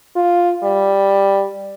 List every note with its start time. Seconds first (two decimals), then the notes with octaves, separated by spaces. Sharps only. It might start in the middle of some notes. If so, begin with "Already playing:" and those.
0.16 F4
0.63 G3